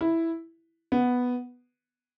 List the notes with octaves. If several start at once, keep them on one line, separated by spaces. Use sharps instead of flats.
E4
B3